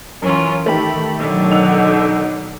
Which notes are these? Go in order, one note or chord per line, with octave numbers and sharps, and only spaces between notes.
F#2 E3 C#4 F4 A#4
D#3 A3 G4 B5
B2 D3 D#3 F#3
D#4 F#5 E6 F7